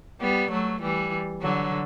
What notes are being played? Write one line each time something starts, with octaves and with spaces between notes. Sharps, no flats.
G3 B3
F#3 A3
E3 G3
D3 F#3